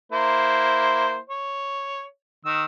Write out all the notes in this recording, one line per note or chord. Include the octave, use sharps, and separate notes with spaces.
A#3 E4 C5
C#5
D#3 E6